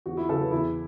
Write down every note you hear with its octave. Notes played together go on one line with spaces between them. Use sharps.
E2 F#4
E4
C#3 F#3 A4
B4
E2 E4